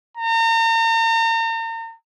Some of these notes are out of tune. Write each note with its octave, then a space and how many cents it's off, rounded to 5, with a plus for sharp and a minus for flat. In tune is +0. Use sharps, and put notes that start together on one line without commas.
A#5 -40